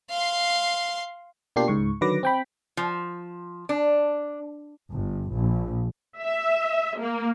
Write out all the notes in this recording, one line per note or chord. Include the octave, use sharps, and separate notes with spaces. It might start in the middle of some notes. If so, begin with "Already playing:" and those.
F5 C6
B2 A#3 D4 F4 G4 C7
C#2 G#2 C#6
D3 D#3 F#3 B4 D6 A#6
C4 G5 B5
F3
D4
G1
A#1
E5
A#3